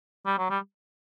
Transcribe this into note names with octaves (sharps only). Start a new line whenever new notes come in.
G3
F#3
G3